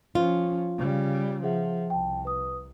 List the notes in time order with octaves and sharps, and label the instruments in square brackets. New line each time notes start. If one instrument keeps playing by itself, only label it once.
[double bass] F3 C#4 [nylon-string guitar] F4
[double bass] C#3 G3
[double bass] F3 [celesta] G#4 E5 F#5
[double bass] C2 [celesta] G5 A5
[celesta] B4 D#6